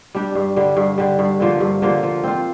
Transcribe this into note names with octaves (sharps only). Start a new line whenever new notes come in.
G3 D4 G4
G2
D3 G3
G2
D3 G3
G2
D3 F3 A#3
G2
D3 F3 A#3
F3
C4 F4